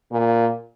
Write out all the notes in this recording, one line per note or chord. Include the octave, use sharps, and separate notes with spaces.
A#2